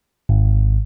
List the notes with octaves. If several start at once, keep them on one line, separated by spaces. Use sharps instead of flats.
G#1